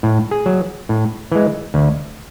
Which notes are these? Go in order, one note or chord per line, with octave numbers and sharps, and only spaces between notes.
A2
G#4
F#3
A2
E3 G#3
D2